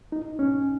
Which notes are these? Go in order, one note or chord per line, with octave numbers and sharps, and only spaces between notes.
D#4
C#4